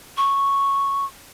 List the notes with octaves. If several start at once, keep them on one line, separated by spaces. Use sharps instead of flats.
C#6